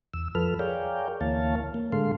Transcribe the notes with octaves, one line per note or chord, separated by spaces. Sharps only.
E2 E6
F2 F3 A4 B4 F6
G#4 A#4 C#5 D5 F5 G5
D2 E3 A#3 C#5 F5 A5
A#3
A2 D3 G#3 A4 F5 C6